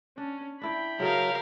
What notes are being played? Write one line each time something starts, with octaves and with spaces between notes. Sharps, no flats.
C#4 D4
D4 E4 D5 G5 B5
C#3 F#3 A4 A#4 D#5 F5